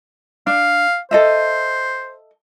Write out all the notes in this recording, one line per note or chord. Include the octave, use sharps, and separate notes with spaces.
D4 F5
A4 C5 D#5 E5